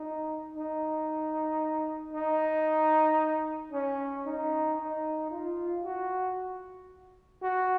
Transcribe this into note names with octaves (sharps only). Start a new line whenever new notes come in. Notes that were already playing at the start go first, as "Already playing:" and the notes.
Already playing: D#4
D#4
D#4
C#4
D#4
D#4
F4
F#4
F#4